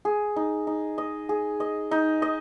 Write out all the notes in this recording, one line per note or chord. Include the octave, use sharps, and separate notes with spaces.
G#4
D#4
D#4
D#5
G#4
D#5
D#4
D#5